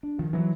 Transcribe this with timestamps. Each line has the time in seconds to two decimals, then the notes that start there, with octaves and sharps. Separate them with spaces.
0.03 D4
0.18 D#3 F3
0.33 E3 F#3